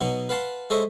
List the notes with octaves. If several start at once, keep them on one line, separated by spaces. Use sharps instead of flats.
B2 F#3 D#4
B4 F5 F#5 A5 C6
G#3 A4 C5 C#5 D#5 E5